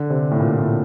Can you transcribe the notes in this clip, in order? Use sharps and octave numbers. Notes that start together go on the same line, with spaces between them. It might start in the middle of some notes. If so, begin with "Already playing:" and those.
Already playing: D3
C3
A2
A#2
A2